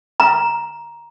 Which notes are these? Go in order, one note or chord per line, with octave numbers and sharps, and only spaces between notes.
A#5